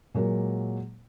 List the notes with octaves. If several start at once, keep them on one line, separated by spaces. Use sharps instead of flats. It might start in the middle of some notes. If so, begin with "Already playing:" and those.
A#2 F#3 G#3 A#3